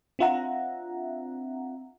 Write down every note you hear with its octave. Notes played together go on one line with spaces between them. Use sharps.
C4 D4 F4 E5 F#5 A#5